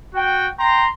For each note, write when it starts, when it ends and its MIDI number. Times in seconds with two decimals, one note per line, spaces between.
0.14 0.48 66
0.14 0.48 79
0.59 0.86 79
0.59 0.86 82
0.59 0.86 84